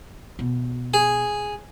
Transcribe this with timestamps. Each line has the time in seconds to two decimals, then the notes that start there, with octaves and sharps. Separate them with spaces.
0.39 B2
0.94 G#4